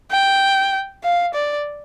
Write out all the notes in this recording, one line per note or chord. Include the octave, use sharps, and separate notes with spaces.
G5
F5
D5